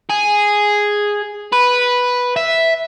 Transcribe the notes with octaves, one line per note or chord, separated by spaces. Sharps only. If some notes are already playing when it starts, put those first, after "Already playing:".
G#4
B4
E5